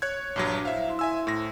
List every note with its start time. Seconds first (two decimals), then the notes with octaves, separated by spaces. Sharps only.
0.02 C#5 F#6 G#6
0.36 A#1 G2 F#3 D4
0.65 E4 C5 E5 F5
0.88 E4 C5 C6
0.99 E5 G#5 E6
1.27 A2 A#6